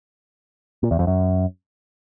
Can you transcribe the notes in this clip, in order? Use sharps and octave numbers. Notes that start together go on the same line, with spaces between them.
A#2
E2
F2
F#2